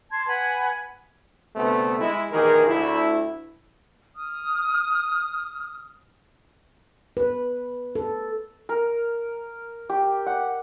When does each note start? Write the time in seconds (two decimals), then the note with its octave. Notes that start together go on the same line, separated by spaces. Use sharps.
0.11 A5 C6 G#6
0.27 B4 F#5 G#5 B5
1.55 D2 C3 A3 B3
1.99 G#3 E4
2.30 A#1 D#3 E3 G4 G#4 A#4
2.66 D2 E4
4.15 D#6 F6
7.17 B4
7.95 A4
8.69 A#4
9.89 G4
10.26 F#5